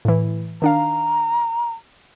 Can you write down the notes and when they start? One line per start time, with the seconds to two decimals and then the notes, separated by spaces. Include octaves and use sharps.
0.05 A2 E3
0.62 D#3 D4 F5 A#5